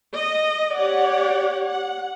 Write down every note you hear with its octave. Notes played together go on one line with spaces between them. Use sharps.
D#5
G4 C#5 D5 F#5
F#5